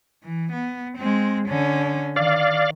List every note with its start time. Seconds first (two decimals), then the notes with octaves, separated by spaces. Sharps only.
0.23 E3
0.52 B3
0.97 G#3 C4
1.48 D3 C#4
2.16 D#3 D5 F5